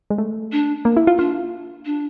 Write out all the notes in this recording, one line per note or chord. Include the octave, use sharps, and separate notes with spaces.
G#3
A3
D4
A#3
E4
F4
D4 F4
D4